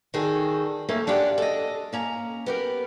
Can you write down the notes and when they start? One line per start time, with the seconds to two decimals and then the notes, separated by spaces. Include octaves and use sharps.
0.14 D#3 G3 F#4 G#4 A4
0.89 A3 A#3 C#4 D#4 A4 E5
1.07 C#4 D4 F4 G4 D5 F#5
1.38 A4 D#5
1.93 A#3 C#4 A#5
2.46 B3 G4 A#4